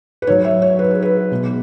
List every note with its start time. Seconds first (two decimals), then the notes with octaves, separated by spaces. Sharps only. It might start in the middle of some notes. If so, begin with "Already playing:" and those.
0.22 B4
0.27 G#2 F#3 C#5
0.44 E5
0.62 C#5
0.79 B4
0.91 G#4
1.02 B4
1.31 B2 G#3